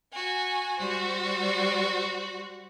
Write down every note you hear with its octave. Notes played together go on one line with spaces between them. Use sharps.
F#4 G#5
G3 F#4 C5